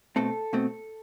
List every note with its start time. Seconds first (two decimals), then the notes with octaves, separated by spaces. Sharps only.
0.16 B2 A3 C4 A4
0.53 B2 A3 C4